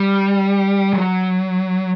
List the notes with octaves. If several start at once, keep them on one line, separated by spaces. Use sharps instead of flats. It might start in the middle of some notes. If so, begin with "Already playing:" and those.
Already playing: G3
F#3